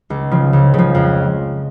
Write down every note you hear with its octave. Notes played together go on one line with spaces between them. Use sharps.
C#2
C#3 F3
C#2
C#3 F3
F2